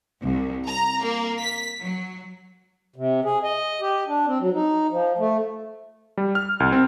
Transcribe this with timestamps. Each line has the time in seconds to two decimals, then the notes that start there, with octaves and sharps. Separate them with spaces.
0.21 C2
0.67 A#5
1.02 A#3
1.42 B6
1.79 F#3
2.96 C3
3.25 G#4
3.44 D#5
3.81 G4
4.08 D4
4.27 C4
4.40 F#3
4.54 D#4
4.90 F3
5.18 A3
6.17 G3
6.35 F6
6.60 C2
6.72 C4